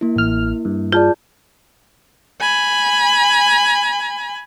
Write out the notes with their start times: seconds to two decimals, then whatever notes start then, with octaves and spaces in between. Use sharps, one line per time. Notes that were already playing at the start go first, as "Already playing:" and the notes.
0.01 A#3 E4
0.16 A1 F6
0.65 G2
0.92 F4 G#4 D5 A5 G6
2.41 G#5 B5